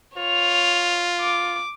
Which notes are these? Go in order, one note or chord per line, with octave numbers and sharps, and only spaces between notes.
F4 C#5 F7
D6